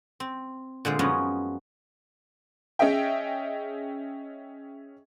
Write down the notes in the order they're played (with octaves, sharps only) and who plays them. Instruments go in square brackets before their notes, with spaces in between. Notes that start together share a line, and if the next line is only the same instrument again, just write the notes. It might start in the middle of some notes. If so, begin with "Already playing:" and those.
[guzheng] C4
A#2 D3 G#3 C5
F#2 F3 G#3 B3 C#4 D#4
[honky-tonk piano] C#4 G#4 D#5 E5 G5